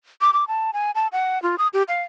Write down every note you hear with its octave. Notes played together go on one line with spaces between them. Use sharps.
D6
D6
A5
G#5
A5
F#5
F4
D#6
G4
F5